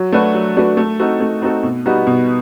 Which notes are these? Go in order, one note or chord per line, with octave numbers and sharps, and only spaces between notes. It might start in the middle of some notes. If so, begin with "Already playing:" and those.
Already playing: F#3
A3 D4 F#4 B4
F#3
A3 D4 F#4 B4
A3
C4 D#4 F#4 A4
A3
C4 D#4 F#4 A4
B2
G3 B3 D#4 F#4
B2